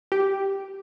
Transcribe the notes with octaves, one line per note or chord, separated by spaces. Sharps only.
G4